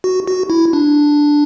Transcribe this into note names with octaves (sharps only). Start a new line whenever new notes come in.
F#4
F#4
E4
D4